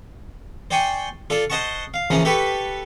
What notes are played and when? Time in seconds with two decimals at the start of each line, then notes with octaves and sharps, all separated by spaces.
0.71 C5 D5 G5 G#5 C#6
1.30 F4 A4 D5
1.50 C5 D#5 F#5 A5 C#6
1.94 F5
2.10 C#3 E3 F3 A#3 C#4
2.25 G4 A4 B4 B5 C#6